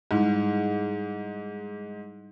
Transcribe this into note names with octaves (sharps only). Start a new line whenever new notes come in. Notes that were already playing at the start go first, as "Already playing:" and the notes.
G#2 G3 D#4 E4